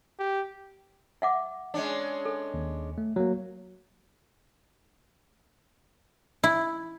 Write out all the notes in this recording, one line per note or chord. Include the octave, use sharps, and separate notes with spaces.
G4
E5 F#5 D6
G#3 C#4 D4
A4
D#2
A3
F#3 A#3
E4